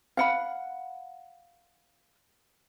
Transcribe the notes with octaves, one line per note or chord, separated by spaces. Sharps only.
F5 F#5 B5